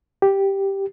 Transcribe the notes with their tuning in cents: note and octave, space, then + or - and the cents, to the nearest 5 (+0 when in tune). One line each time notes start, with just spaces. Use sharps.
G4 +0